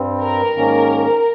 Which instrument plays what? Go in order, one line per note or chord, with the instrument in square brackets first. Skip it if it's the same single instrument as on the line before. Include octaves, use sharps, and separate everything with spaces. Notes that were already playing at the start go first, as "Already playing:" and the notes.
Already playing: [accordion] G2 G3 C4
[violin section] A#4
[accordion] G#2 D#3 A#3 C#4